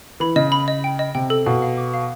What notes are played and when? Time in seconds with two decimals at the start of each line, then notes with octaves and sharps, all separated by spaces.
0.20 E3 B5
0.36 C#3 D#5
0.52 B5
0.68 D#5
0.84 G5
0.99 D#5
1.15 C3 G5
1.30 A4
1.46 B2 F5
1.62 F5
1.77 D6
1.94 F5